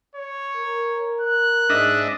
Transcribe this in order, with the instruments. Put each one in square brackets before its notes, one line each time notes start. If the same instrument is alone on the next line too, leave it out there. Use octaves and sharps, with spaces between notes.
[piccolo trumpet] C#5
[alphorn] A#4
[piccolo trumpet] F#6
[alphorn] G#2 [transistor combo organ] D4 D#5 E5